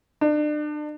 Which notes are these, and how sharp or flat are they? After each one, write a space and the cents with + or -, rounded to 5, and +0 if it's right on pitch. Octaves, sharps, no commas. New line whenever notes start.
D4 +35